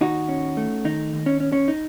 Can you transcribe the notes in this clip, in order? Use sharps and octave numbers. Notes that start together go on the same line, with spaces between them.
D#2 D#4 F#4
C#4
A3
D#3 D#4
D#2
C#4
C#4
C#4
D#4